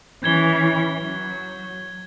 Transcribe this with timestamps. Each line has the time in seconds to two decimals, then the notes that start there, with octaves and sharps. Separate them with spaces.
0.23 E3 C#4 G6 G#6 G7
0.98 F#3